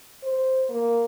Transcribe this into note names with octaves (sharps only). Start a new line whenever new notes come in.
C5
A#3